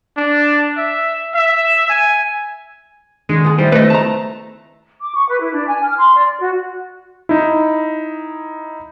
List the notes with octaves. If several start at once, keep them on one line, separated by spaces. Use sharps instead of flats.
D4
E5
E5
G#5
D3 D#3 G#3 F#4
B3 G#4
G3 D#4 E4 C5
A3 B4 D#5
A5 A#5
D6
C#6
B4
E4
D4
G#5
F6
C6
D5
F#4
D#4 E4